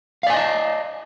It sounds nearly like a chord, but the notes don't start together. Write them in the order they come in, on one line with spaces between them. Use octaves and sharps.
F5 D5 G#5 D#5 A5